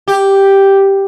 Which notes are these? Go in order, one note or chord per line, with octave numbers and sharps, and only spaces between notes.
G4